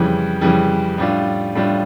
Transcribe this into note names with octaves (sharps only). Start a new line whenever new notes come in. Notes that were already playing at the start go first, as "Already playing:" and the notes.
Already playing: F2 C#3 E3 G3
F2 C#3 E3 G3
A2 G3 D4 F4
A2 G3 D4 F4